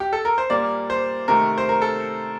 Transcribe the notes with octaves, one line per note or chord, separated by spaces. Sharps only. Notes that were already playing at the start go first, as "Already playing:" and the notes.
G4
A4
A#4
C5
A#2 G3 A#3 D5
C5
C3 D#3 A3 C4 A#4
C5
A#4
A4